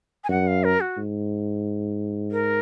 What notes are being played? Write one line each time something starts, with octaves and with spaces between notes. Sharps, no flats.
G#5
F#2 F#5
F5
A#4
F#4
G#2
A#4